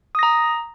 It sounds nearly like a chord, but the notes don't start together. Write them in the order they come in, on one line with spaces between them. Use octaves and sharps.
D#6 A#6 A#5